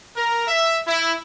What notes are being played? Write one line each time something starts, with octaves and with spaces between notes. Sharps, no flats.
A#4
E5
E4